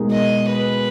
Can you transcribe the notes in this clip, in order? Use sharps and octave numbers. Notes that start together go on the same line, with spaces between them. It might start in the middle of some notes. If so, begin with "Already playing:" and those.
Already playing: B2 G#3 D#4 F#4 A#4
D#5
B4